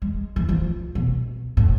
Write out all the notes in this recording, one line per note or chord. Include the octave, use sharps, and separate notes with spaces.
G#3
E3
F3
B2
A2